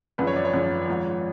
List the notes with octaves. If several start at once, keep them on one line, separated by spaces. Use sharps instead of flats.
G#1 F#2 C#3 F3 B4
C#5
D5
C#5
G#1 F#2 C#3 F3
G#1 G#2 F3